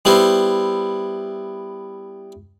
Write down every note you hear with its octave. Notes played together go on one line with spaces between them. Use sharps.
G3 B3 E4 C5